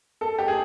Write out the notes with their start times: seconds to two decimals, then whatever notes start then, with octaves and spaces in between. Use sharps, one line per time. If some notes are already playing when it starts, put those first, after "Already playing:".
0.21 A4
0.38 G4
0.48 G#4